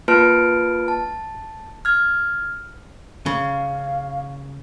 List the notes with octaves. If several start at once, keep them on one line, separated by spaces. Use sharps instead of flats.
A#3 F4 B4 A5 F6 D7
A5
F6 G#6
C#3 F5